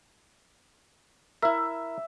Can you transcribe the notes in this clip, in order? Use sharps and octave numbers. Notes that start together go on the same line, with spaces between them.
E4 A#4 E5